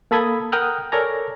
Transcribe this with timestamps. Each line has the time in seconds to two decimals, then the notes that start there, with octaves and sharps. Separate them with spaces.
0.11 A#3 A4 B5 D#6 G#6
0.52 A#4 F#5 G5 D#6 F6 F#6
0.92 A4 A#4 C#5 D5 G#5 A#5